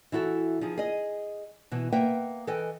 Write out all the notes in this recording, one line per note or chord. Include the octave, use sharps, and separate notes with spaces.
E3 E4 F#4 A4
F3 D#4 G#4
G#4 D#5
B2 E3
A#3 B4 E5 F#5 G5
E3 A4 B4 D#5 G5 G#5